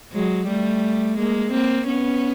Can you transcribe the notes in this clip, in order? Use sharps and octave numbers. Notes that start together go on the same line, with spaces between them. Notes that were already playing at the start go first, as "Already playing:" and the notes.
F#3 G#3
G3 A3
G#3 A#3
A#3 C4
B3 C#4